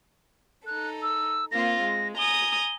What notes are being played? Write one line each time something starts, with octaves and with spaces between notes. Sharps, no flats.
D#4 A4 F#6
E6
A#3 C4 F4 A#6
G#3
G#5 A#5 D#6 G7